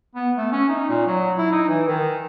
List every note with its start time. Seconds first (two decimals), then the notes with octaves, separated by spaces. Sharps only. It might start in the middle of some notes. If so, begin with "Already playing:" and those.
0.15 B3
0.37 A3
0.52 C#4
0.69 D#4
0.89 A#2
1.07 F#3
1.38 E4
1.52 D#4
1.69 E3
1.88 D#3